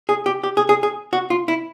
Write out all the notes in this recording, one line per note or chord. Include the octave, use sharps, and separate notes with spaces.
G#4
G4
G4
G#4
G#4
G#4
F#4
F4
E4